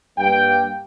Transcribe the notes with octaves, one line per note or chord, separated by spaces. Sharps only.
G2 A#3 G5